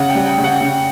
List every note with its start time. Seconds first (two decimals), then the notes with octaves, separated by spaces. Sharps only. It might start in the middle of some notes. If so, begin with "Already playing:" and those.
Already playing: C#3 F#5
0.10 G5
0.15 G3
0.27 G5
0.38 C#3
0.44 F#5
0.61 C#3